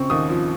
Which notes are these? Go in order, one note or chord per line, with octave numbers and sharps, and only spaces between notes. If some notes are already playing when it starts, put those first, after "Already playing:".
Already playing: C#3 C4 C#6
D#2 D#6
F3